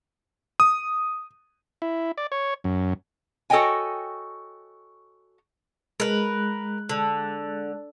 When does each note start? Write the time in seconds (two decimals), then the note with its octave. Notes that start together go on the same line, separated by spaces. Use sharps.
0.60 D#6
1.82 E4
2.18 D5
2.32 C#5
2.64 F#2
3.50 F#4 A4 C#5 D#5 G5 G#5
6.00 G#3 A#4 B4 F#6
6.89 D3